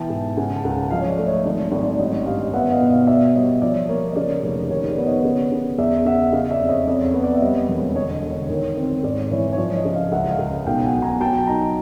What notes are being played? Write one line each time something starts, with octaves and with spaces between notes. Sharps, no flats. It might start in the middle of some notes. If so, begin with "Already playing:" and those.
Already playing: B2 E3 G5 A5
G#2
C#3 F#5 G#5
A5
C#2 F#5 G#5
F3 D#5 F5
C#5
D5
A3
C#5 D#5
G#1 D5
G#1
D5
A1 C#5 D#5
G2 D#5 F5
B3 E5 F#5
D#5 F5
B2
D#5 F5
F5
B2 D5 E5
G3 C#5 D#5
F3 D5 E5
A#3 C#5
D#5
C#3 D5
F1 C#5
D#3 C#5
D5
B3
C#5 D#5
C#3
C#3
E2 D5 E5
C#3 E5 F#5
C#3 D#5 F5
D5 E5
F2
C#5 D#5
F2 D5
C#5
B3
D5
E5
G3 C#5 D#5
E1
D3 C#5 D#5
C#5 D#5
D3
C#5
D#3
C4
G#2 D5
C#5
D5
E3 C#5
C#5
F3 D5
C#5 D#5
C#3
D#5 F5
C#2 E5 F#5
D#5 F5
C#2
B1 F5 G5
F#5 G#5
B2
G#5 A#5
F#3 G5 A5
D#4 G#5 A#5